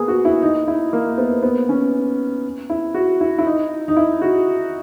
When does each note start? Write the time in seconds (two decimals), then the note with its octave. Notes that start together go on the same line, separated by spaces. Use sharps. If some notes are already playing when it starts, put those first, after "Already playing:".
Already playing: A#3 B3 G#4
0.08 F#4
0.25 E4
0.42 D#4
0.68 E4
0.93 A#3
1.18 B3
1.43 B3
1.69 C#4
2.70 E4
2.94 F#4
3.21 E4
3.38 E4
3.46 D#4
3.88 D#4
3.97 E4
4.22 F#4